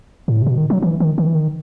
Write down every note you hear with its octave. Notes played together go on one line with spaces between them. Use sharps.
A2
C3
B2
D#3
F#3
E3
D#3
D#3
E3
D#3